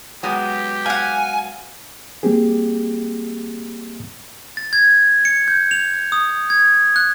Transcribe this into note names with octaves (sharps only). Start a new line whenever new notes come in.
F#3 G#3 B3 G4
F5 F#5 G#5
G3 A#3 C4 G4 G#4
A6
G#6
C#7
G6
F7
D#6
G#6
F#6